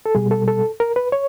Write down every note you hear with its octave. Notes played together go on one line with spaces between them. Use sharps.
A4
B2 G3 G#4
A4
A4
A#4
B4
C#5